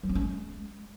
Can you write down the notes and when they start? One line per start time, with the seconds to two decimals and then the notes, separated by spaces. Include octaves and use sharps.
0.03 F#3
0.09 C4
0.15 C#4
0.21 G#3